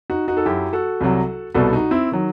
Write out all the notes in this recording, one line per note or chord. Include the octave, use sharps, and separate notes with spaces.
D#4 F#4
D#4 F#4
A4
F#2 F#3 E4 G4
F#4 A4
C2 C3 F#3
C2 B2 G3 F#4 A4
D#4 F#4
C4 E4
D#3 F#3